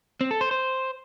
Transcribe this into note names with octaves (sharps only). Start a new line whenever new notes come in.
C4
A4
C5
C5